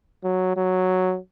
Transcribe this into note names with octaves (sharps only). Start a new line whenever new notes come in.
F#3
F#3